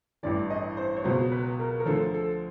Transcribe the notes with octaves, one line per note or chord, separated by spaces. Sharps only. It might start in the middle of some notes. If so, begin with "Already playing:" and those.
A1 G2 E3 D5
D#5
C5
C#5
C#2 B2 F#3 C5
B4
A#4
A#4
D2 D3 F3 A4
A4